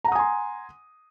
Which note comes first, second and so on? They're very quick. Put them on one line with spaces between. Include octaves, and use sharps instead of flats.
A#5 F#5 D#6 G#5 C6